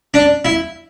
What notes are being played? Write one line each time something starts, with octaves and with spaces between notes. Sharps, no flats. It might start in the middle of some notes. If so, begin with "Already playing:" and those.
D4
E4